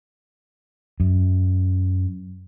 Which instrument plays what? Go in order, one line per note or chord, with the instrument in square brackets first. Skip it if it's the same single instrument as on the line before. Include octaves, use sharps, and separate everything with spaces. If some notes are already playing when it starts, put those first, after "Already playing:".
[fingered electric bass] F#2